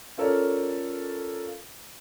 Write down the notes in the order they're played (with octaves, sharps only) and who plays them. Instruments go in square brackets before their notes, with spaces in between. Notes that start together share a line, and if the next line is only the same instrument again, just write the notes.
[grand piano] C#4 F4 A4 A#4 C#5 D5